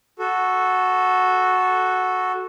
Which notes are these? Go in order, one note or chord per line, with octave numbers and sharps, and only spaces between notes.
F#4 A4